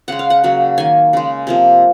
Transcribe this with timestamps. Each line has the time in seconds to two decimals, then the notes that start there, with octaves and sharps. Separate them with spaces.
0.08 C#3 G#3 F#5
0.19 F5
0.30 F#5
0.44 C#3 F#3 A#3
0.78 D#3 A#3 G#5
1.13 C#3 G#3
1.47 C3 F3 A#3